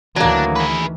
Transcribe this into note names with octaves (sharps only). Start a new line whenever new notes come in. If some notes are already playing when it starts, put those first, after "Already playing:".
D2 D#3 E3 F#3 A#3 D4
G#4 B4